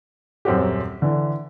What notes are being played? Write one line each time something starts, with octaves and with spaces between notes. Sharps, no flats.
D#1 F#2 C4 F#4 G4
D3 E3